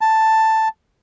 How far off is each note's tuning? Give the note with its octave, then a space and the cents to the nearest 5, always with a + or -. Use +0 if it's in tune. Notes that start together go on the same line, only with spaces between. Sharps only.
A5 +5